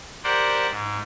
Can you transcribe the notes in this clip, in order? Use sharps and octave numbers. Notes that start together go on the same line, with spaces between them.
G4 A#4 C5 D5 F#5
G#2